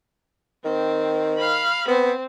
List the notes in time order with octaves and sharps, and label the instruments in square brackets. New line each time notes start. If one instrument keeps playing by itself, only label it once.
[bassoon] D#3 [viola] C4
[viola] F5 B5
[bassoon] B3 [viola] C4